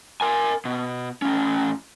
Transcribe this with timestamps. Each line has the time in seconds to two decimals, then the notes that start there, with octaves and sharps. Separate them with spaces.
0.21 A#4 G#5
0.65 B2
1.22 A2 C#4